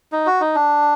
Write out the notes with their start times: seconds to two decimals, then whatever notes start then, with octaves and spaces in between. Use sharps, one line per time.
0.12 D#4
0.26 F#4
0.41 D#4
0.55 D4